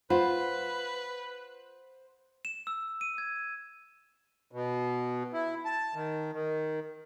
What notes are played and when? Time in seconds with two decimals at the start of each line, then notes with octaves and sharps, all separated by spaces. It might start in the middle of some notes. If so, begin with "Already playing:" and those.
0.10 F4 B4 C5 F#5 B5
2.45 E7
2.67 E6
3.01 D#7
3.18 G#6
4.52 B2
5.33 E4
5.65 A5
5.95 D#3
6.33 D#3